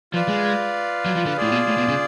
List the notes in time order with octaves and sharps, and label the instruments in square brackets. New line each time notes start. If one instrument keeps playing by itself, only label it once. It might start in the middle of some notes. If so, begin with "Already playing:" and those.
[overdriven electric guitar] F3 [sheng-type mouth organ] F4 B4 D5 F5
[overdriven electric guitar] G#3
F#3
F3
D3
[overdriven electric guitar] A2 [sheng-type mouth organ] F4 G#4 D5
[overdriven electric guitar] B2
A2
B2
C#3